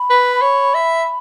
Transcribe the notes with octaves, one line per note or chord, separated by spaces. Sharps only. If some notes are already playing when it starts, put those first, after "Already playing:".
Already playing: B5
B4
C#5
E5